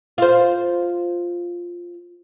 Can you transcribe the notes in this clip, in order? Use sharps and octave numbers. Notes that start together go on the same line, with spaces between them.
F4 C5